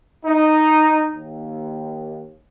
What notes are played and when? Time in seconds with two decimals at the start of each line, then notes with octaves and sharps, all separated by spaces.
0.25 D#4
1.12 D#2